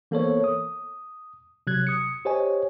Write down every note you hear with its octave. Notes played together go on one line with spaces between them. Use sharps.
E3 A#3 B3 A4 C5 C#5
D#6
C3 F#3 F#6 G#6
D#6 C#7
G4 C5 C#5 D#5 G#5